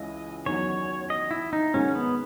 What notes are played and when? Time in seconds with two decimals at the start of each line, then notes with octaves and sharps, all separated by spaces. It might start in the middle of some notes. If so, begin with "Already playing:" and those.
Already playing: C#2 C#3 E3 E4 D#5
0.46 E2 D#3 F#3 C#5
1.10 D#5
1.31 E4
1.53 D#4
1.74 G#2 D#3 G#3 C#4
1.95 B3